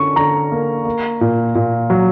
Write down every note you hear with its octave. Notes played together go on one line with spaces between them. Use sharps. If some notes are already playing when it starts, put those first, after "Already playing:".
Already playing: D3 C#4 C#6
D3 A#5
A#3
A#3
A#2
A#2
F#3